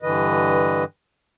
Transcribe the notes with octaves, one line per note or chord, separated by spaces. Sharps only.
G2 D3 E3 B4 D#5